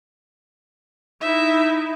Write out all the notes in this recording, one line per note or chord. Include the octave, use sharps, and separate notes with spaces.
D#4 E4 E5